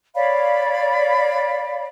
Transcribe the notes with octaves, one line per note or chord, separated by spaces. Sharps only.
C#5 D5 F5 B5